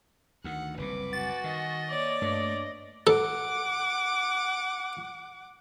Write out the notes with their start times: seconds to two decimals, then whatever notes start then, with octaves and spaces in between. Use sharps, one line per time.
0.44 D2 D#3 F#5
0.78 F#1 C2 C3 B4 D6
1.13 F#4 G#5 A6
1.44 D#3 D#5
1.89 A#3 C#5 D5
2.22 G2 A3 D#5
3.07 A4 F#5 D6